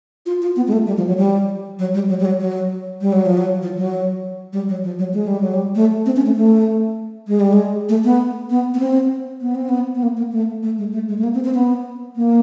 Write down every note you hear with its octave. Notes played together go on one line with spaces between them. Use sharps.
F4
F4
B3
G#3
A3
G3
F3
F#3
G3
F#3
G3
F#3
G3
F#3
F#3
G3
F#3
F3
F#3
F3
F#3
G3
F#3
F3
F#3
G#3
G3
F#3
G3
A3
C4
C#4
A3
A3
G#3
G3
G#3
A3
B3
B3
B3
C4
B3
C4
B3
B3
A#3
A#3
A3
A3
G#3
A3
G#3
A3
A#3
C4
C4
B3
A#3